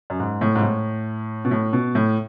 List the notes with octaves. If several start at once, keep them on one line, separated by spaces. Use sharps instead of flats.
F#2
G#2
A2
G#2
A2
B2
A2
B2
A2